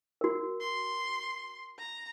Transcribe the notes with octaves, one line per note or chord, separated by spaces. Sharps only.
F#4 A#4
C6
A#5